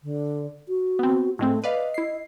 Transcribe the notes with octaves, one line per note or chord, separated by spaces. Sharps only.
D3
F#4
B3 C4
A2 G#3 A3 C4
B4 D5 D#5 F5
E4 C7